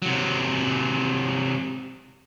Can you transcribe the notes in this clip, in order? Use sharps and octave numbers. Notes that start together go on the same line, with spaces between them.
C3 F#3